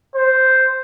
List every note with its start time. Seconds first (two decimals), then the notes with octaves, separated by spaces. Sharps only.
0.15 C5